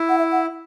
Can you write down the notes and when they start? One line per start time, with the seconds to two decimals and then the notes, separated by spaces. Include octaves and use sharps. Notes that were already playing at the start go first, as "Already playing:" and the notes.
Already playing: E4
0.09 F#5
0.18 E5
0.32 F#5